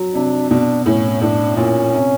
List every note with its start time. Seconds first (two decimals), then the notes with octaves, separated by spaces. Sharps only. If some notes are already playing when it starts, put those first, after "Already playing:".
Already playing: F#3
0.14 C3 D4
0.50 B2 D4
0.86 A2 C#4
1.21 A2 D4
1.57 A#2 C#4
1.93 C3